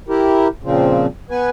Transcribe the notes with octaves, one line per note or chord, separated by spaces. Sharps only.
E4 G4 A#4
A#2 C#3 F3 C4
B3 B4 G#5